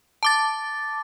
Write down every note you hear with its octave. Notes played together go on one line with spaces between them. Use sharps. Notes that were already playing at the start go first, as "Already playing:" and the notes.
A5 D6 A6